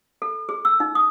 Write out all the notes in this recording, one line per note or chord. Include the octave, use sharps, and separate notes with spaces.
A4
G#4
E6
D#4
D#6